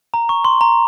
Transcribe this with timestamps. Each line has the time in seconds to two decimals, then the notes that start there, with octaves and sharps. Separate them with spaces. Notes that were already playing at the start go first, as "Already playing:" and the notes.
0.14 A#5
0.29 C#6
0.45 C6
0.61 A#5